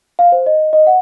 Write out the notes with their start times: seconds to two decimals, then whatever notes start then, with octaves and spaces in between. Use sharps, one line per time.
0.19 F5
0.32 C5
0.46 D#5
0.73 D#5
0.87 F#5